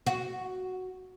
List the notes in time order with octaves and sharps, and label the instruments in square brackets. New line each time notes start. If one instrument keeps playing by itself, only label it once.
[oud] F#4